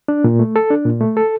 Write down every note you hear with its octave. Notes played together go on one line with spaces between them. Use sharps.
D4
A#2
A3
A4
D4
A#2
A3
A4